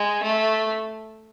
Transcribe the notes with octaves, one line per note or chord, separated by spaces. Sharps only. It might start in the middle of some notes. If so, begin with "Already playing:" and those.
Already playing: G#3
A3